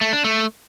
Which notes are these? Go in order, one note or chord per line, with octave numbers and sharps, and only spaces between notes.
A3
D4
A3